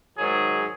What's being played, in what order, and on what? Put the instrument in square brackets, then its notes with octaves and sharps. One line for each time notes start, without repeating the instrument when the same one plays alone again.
[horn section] G#2 D#3 F#3 G#4